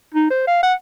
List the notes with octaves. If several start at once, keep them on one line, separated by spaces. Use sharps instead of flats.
D#4
C5
F5
F#5